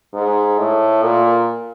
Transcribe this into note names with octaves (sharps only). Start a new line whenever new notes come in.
G#2
A2
A#2